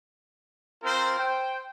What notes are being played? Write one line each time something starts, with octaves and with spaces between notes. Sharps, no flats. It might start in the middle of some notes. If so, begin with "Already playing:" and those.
C4 F4 A#4 C5
C5 G5